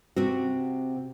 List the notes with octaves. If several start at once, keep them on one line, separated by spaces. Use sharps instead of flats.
C3 C4 F#4